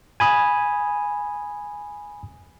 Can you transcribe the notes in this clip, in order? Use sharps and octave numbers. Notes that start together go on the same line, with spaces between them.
G#5 B5 D#6